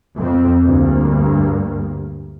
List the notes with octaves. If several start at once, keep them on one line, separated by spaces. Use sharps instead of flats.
F2 C4
D2 G2 A#3